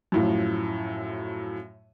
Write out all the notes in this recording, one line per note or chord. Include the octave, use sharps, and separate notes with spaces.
F#2 A2 F3